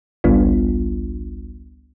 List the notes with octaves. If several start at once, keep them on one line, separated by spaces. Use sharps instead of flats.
G#1 C#2 G3 B3 D4 F4